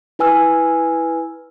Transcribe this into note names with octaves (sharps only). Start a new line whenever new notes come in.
E4 B4 G#5 E6 F6